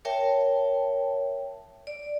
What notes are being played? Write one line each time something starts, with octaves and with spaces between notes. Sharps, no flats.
A#4 C#5 E5 G5 A5
D5